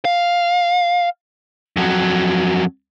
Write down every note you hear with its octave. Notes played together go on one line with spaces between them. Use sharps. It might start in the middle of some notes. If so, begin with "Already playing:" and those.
F5
F2 F#3